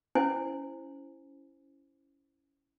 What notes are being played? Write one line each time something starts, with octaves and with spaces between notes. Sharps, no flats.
C#4 E4 C5 G#5